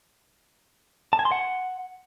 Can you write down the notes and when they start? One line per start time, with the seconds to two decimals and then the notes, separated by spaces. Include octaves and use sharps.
1.13 A5
1.19 G#5
1.25 C6
1.32 F#5